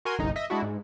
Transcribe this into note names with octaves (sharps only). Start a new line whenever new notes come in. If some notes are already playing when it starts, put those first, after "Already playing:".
F#4 A#4 G#5 C6
G1 C2 D#4
D#5 E5
G#3 D4 E4 F#4
G#2